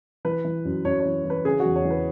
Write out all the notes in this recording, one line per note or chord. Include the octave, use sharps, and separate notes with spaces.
E3 B4
E3
F#2
F#2 C#5
C#5
E3
E3 B4
C#3 G#4
F#4
E2
C#5
E3
B4